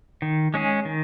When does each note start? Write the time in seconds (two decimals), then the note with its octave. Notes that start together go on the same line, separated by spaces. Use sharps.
0.22 D#3
0.54 G#3 C#4 G#4
0.85 D#3